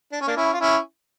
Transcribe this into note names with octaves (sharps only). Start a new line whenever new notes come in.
D4
C#4
A#3 D4
C#4 E4
F4
C#4 E4